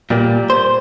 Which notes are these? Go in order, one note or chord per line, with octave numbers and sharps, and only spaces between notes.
A#2 G3 A#3
C5